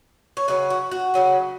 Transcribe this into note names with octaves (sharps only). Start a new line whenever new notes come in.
C#5
C#3 F#3 C#4 B4
F#4
F#4
C#3 F#3 C#4